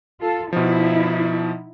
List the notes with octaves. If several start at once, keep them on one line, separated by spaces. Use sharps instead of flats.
F4 A4
B2 F3 D#4 E4